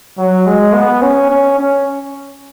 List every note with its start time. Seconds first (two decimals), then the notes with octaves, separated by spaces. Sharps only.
0.18 F#3
0.46 G#3
0.74 B3
1.02 C#4
1.30 C#4
1.58 C#4